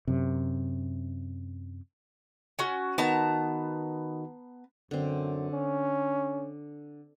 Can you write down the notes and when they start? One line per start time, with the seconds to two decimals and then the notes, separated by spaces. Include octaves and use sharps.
0.07 F#2 C3
2.59 C#4 F#4
2.98 D#3 B3 D#4 F#4 A5 A#5
4.91 F#2 D3 C4
5.52 C#4